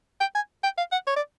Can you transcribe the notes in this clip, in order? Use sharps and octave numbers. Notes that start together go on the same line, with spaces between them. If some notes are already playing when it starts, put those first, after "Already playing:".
G5
G#5
G5
F5
F#5
C#5
D5